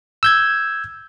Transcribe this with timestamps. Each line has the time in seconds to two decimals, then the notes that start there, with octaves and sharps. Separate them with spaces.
0.23 E6 G6 G#6